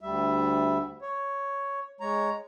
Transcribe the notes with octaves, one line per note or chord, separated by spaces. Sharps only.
D2 G3 E5
C#5
G#3 C#5 A#5